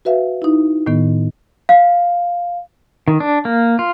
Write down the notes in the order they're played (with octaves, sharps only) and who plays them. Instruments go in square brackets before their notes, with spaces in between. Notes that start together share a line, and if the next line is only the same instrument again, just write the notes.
[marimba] F#4 B4 E5 F5
D#4 E4
A2 D#3 B3
[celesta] F5
[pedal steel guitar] D#3
D4
A#3
F4